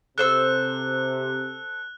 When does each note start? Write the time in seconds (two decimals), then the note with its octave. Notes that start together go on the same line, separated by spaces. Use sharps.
0.18 C3 A4 C5 E6 F#6